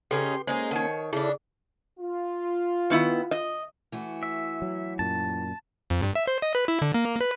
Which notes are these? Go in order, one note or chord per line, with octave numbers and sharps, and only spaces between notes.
C#3 C#4 D#4 G4 A4 B4 C6
G#3 A#3 C#4 D#4 G#4 C5
D#3 D#4 C#5 F#5 A5
C#3 D4 E4 G#4 A4
F4
D#3 B3 E4
D#5
E3 A3 F#4
E5
F#3
F#2 A#2 A5
F2
G2
E5
C5
D#5
B4
E4
D3
A#3
B4